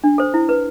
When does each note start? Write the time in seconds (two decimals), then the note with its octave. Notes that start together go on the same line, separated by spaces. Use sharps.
0.04 D4
0.18 A4 C5
0.34 E4
0.49 B4